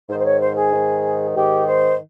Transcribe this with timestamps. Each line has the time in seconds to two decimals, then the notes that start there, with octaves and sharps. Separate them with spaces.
0.08 G#2 D#3 C5
0.18 C5
0.25 C#5
0.41 C5
0.56 G#4
0.72 G#2 D#3
1.35 G#2 D#3 G4
1.66 C5